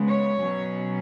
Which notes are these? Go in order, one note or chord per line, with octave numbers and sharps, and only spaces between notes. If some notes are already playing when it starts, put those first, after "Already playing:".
Already playing: C#3 G#3 B3
C#5
B2 F#3 C#4